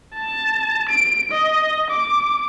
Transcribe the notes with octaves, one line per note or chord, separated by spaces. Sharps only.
A5
D7
D#5
D6